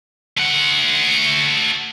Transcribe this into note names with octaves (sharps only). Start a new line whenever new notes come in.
A3 F#5